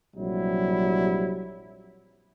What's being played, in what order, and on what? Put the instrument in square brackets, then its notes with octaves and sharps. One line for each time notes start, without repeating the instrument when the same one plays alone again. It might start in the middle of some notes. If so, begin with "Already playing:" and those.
[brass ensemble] A#1 C3 F#3 G3 E4